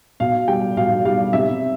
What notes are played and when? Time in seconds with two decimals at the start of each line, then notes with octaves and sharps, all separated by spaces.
0.20 B2 F5
0.48 G3 G5
0.77 B2 F5
1.05 G3 F5
1.33 C3 E5